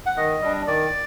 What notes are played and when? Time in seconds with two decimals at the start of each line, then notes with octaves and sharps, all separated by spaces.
0.06 F#5
0.16 D#3 D#5
0.41 G3 D4
0.66 D#3 D5